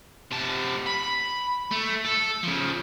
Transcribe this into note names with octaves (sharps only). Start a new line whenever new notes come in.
C3 A5
B5
A3
A4
C#3 F3